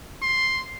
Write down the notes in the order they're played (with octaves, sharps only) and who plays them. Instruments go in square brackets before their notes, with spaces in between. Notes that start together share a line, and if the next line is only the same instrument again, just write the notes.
[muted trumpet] C6